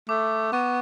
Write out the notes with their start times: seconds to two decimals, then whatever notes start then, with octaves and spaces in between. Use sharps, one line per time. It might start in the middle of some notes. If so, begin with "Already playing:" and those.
0.09 A3 D6
0.52 B3 C#6